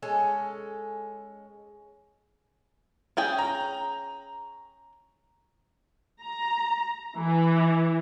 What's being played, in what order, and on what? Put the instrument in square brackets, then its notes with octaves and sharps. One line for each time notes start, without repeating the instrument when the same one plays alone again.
[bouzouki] G#3 C#4 A4
[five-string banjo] C#4 G#4 G5
[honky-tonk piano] A#5
[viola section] A#5
E3